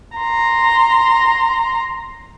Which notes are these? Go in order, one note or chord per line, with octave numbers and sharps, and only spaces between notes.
A#5 C6